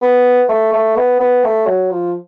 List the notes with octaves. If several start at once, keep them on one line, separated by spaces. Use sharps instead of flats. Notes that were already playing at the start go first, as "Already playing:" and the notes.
B3
A3
A3
B3
B3
A3
F#3
F3